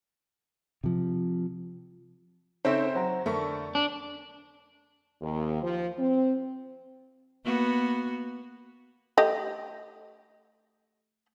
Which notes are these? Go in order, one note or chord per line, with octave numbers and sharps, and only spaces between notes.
C3 F3
C#3 C4 D#4 A4 C5 C#5 E5
F#3 C5 F#5 A#5
F2 D3 A3 A#4 C#6
D4
D#2
F3
C4
A#3 B3 F#4
A3 G4 D#5